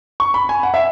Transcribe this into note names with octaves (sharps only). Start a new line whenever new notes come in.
C#6
B5
G#5
F#5
E5